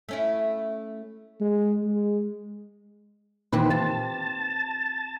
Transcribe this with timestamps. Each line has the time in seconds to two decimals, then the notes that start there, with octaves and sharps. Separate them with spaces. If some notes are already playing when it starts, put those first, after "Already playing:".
0.09 A3 C#4 E4
1.41 G#3
1.84 G#3
3.53 A#2 D#3 E3 C4 G4 B4
3.70 F4 A5